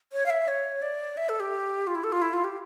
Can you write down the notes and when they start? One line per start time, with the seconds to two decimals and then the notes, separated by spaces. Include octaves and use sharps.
0.13 C#5
0.26 F5
0.30 E5
0.48 C#5
0.82 D5
1.17 E5
1.29 A4
1.40 G4
1.87 F4
1.95 E4
2.04 A4
2.12 F4
2.22 E4
2.33 F4
2.44 G4